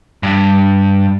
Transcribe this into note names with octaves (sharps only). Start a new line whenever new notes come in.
G2